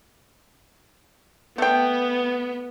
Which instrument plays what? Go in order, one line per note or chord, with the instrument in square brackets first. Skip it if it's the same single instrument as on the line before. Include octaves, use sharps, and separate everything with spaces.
[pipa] A3 G5 [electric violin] B3